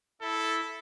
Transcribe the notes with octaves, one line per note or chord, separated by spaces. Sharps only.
E4 A4